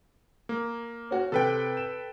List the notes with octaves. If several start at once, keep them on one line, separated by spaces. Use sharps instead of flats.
A#3
C#4 F#4
C3 A4 B4 G5
E7